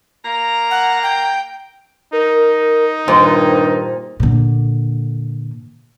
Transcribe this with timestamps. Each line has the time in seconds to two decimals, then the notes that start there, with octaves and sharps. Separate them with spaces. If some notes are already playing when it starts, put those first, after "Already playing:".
0.24 A#3 F5 A#5
0.71 F#5
1.03 G5
2.13 D#4 A#4
3.08 G2 A#2 D#3 C5
4.20 A#2 D3